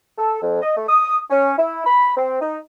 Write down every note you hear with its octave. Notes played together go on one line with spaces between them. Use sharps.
A4
F2
D#5
A3
D#6
C#4
E4
B5
C4
D#4